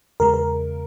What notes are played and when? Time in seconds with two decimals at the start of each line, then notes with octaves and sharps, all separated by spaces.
0.20 E2 C#3 G#3 A#4
0.34 A#4